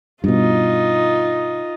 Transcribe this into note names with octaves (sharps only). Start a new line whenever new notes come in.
G2 B2 D#4 F4